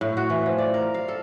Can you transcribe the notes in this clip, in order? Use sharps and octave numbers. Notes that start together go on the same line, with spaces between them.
A2
F#4
E3
F3
D5
A#4
F5
A4